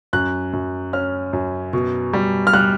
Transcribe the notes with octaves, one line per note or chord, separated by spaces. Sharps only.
F#2 F#6
F#2
C#4 F6
F#2
B2
G3
F6
G3 F#6